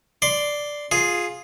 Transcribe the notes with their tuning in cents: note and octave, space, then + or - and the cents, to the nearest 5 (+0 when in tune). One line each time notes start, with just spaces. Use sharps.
D5 +0 C6 -5
F4 +10 G#4 +0